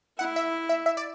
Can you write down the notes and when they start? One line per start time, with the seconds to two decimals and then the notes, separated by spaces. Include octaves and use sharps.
0.19 E4 F#5
0.36 E5
0.69 E5
0.86 E5
0.97 D5